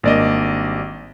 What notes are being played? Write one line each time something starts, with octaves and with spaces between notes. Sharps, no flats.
G#1 G3 A#3 D4 D5 D#5